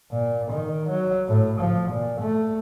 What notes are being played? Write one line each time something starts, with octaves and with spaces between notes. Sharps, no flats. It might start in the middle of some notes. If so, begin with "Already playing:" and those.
A#2
D#3
F#3
A2
F3
A#2
A3